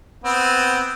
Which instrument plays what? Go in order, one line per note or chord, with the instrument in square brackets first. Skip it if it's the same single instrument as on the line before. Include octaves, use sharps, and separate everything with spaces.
[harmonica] B3 C4